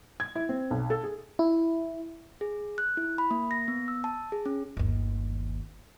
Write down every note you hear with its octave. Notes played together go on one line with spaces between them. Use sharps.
G#6
E4
C4
B1
A4
G#4
E4
G#4
F#6
E4
B5
A#3
A#6
B3
E6
A5
G#4
C#4
G1 D#2